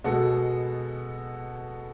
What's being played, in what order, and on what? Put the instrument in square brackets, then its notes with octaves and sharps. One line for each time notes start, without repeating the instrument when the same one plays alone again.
[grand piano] B2 G#3 B3 F#4 A4